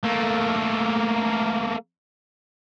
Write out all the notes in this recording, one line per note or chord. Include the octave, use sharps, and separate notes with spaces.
A3 A#3